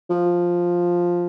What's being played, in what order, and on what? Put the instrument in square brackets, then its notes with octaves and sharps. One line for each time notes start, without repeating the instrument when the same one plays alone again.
[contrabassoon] F3